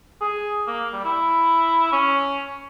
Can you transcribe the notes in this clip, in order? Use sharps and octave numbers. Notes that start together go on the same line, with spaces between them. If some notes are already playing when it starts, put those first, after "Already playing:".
G#4
A#3
G3
E4
C#4